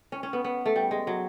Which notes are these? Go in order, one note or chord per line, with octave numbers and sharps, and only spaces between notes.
C#4
C#4
B3
B3
A3
G3
G#3
F#3